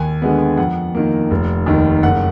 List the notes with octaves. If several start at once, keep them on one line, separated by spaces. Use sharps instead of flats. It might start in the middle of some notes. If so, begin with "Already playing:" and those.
Already playing: D#2 G#5
D3 G#3 B3
F2 F#5
D#3 A#3
F1
D#2 D#3
F#1 F#5